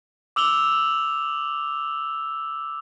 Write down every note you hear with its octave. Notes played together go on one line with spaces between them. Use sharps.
D6 E6 F7 G7